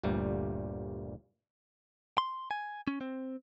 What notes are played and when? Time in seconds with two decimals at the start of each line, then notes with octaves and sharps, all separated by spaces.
0.03 G1 D2 A#2 G3
2.18 C6
2.51 G#5
2.87 C#4
3.01 C4